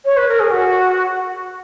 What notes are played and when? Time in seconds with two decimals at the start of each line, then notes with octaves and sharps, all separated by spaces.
0.05 C#5
0.17 B4
0.28 A#4
0.39 G#4
0.50 F#4